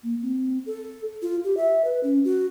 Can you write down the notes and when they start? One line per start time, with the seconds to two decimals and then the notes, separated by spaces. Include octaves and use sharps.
0.03 A#3
0.22 C4
0.66 A4
1.22 F4
1.44 G4
1.57 E5
1.85 B4
2.03 C#4
2.25 F#4